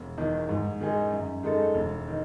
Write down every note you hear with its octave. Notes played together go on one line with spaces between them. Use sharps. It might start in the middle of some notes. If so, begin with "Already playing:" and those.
Already playing: E1
E2 D#3
G#2
D#3 G#3 D#4 G#4
F#2
D#3 G#3 D#4 A4
E1
D#3